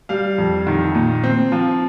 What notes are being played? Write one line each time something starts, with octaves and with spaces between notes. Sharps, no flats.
G3 F5
F2
D#3
A#2
C4
F3